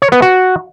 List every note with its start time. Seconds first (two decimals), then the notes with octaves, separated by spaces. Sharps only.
0.02 C#5
0.12 B3
0.22 F#4